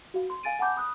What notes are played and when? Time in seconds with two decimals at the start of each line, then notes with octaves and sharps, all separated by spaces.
0.14 F#4 F5
0.30 C6
0.43 F5 G#5 A6 D7 D#7
0.59 F#5 G#5 A5 B5 D6 G6
0.76 B5 D#6 F6 F#6